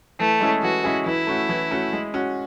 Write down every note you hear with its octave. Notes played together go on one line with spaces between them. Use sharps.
E3 A3
G#3 C#4 E4 G#4
E3 F#4
G#3 C#4 E4 G#4
E3 E4
A3 C#4 F#4
E3
A3 C#4 F#4
G#3
C#4 F#4